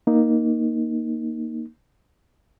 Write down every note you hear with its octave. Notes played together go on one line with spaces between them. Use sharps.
A#3 D#4